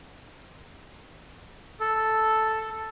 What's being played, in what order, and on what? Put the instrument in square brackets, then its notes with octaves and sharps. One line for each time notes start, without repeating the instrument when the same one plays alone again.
[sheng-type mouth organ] A4